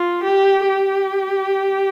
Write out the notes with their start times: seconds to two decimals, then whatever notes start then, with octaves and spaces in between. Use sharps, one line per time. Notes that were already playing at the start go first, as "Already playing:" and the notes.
Already playing: F4
0.24 G4
0.69 G4